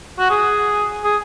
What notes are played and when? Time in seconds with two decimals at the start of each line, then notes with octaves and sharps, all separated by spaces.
0.19 F#4
0.30 G#4
1.04 G#4